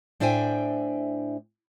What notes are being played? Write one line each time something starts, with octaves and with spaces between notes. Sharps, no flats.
A2 D4 C5 E5 G5 G#5